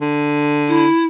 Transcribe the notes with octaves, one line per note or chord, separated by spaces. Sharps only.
D3
E4